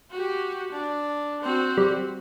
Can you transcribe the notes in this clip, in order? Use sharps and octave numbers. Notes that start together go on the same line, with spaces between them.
F#4 G4
D4
C4 F#4
G3